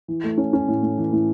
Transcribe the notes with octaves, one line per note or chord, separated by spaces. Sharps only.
E3
A3
C#4
C#4
A2
A2
E3
A2